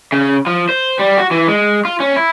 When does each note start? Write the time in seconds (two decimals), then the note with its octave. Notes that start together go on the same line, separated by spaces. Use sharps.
0.12 C#3
0.47 F3
0.69 C5
0.99 G3
1.18 F#4
1.31 E3
1.48 G#3
1.85 F4
2.00 C#4
2.16 E4